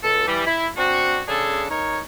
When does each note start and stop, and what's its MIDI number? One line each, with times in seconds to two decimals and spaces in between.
0.03 0.25 37
0.03 0.25 69
0.27 0.45 52
0.27 0.45 55
0.46 0.68 64
0.77 1.20 60
0.77 1.20 62
0.77 1.20 66
1.28 1.64 49
1.28 1.64 62
1.28 1.64 68
1.28 1.64 69
1.70 1.99 63
1.70 1.99 70
1.70 1.99 73